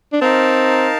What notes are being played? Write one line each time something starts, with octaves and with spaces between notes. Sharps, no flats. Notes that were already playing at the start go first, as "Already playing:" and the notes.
D4
C4 D#4 A#4 F5 A5